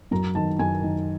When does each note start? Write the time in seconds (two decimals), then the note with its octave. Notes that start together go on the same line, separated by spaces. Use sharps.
0.11 F#2 A#5
0.35 D#3 A5
0.59 F#2 G#5
0.83 D#3